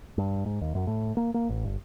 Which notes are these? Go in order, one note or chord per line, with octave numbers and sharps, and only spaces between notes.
G2
G#2
D#2
F#2
A2
A#3
A#3
A1
G1